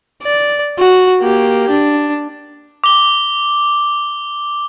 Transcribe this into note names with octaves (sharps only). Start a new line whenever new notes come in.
D5
F#4
A#3 G4
D4
D6 G7